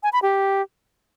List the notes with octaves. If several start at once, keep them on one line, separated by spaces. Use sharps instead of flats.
G#5
B5
G4